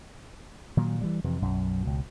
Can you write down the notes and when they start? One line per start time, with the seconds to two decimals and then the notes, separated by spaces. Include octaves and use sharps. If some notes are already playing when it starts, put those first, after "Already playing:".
0.77 A#2 D#3 F#3
1.01 E3 G3
1.24 F2 C3 E3
1.42 B1 F#2
1.83 C#2 B2